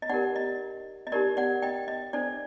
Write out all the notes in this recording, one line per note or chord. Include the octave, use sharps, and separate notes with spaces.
D#5
D#4 G4 A#4 D5 F#5
D#5
D#5
D#4 G4 A#4 D5
D5 F#5
D#5 G5
D#5
D4 A4 C5 D5